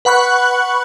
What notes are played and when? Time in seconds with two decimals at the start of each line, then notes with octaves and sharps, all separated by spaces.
0.05 B4 F#5 B5 C#6 F#6